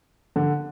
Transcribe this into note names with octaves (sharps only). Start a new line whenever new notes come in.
D3